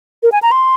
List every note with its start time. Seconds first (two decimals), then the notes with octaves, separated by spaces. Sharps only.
0.23 A#4
0.32 G#5
0.42 A#5
0.51 C6